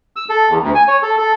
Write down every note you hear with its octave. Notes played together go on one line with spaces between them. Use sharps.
E6
A4
E2
D2
G#5
C#5
A4
A4